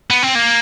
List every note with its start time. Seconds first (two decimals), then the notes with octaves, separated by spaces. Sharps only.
0.10 B3
0.23 C4
0.35 A#3